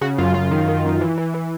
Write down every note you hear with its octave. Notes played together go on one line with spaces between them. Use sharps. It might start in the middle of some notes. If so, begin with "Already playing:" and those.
C#3 F#4
F#2 F4
F#2 F4
D#3
D#3
F#2
E3
E3
E3